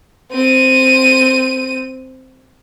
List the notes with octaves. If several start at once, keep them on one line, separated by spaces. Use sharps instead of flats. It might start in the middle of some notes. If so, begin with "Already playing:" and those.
C4 D#7